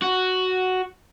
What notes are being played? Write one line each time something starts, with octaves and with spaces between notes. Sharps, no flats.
F#4